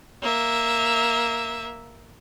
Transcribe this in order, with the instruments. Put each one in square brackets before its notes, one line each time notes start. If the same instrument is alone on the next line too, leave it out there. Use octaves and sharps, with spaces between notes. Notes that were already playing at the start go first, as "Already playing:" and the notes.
[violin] A#3 E5